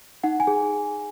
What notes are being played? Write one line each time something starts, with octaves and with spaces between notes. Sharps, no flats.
D#4 F#5
G#5
G#4